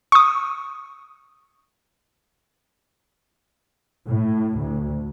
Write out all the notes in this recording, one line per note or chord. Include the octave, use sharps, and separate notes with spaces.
C#6 D#6
A2
D2